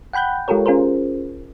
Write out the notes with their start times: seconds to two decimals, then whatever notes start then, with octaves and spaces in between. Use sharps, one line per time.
0.13 F#5 G5 B5 F#6 G6
0.48 G#3 F4 G4 A4 A#4 C#5
0.66 C#4 F4 G#4 A#4 C5